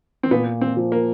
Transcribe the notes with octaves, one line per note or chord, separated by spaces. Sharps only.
C4
A#2 B3
C4
F3
A#3